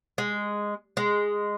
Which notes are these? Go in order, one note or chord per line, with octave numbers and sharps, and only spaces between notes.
G#3
G#3